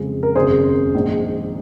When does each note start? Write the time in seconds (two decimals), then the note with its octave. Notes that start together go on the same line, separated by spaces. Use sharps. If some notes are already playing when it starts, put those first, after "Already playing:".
Already playing: F2 C#3 F3 G#3
0.23 A#4
0.35 G#1 F#2 C#3 G#4 C5
0.94 A#1 G#2 D#3